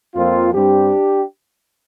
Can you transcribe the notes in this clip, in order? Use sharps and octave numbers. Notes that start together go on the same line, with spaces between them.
F2 F3 A#3 C4 F4
G2 G3 C4 D4 G4